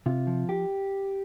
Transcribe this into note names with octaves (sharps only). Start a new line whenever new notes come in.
C3 F4
F3
G4